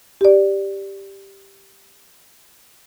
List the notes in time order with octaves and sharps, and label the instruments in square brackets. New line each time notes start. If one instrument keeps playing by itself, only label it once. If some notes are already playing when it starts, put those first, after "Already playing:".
[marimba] G4 D5